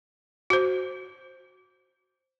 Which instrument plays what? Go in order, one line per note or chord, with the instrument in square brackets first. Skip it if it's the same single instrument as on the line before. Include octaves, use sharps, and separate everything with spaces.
[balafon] F#4 C5